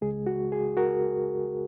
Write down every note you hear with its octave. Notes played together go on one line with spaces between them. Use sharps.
C#2 C#3 G#3 G#4
F#4
G#4
F#4 A#4